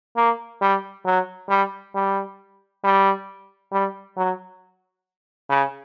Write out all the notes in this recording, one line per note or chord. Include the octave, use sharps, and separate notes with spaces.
A#3
G3
F#3
G3
G3
G3
G3
F#3
C#3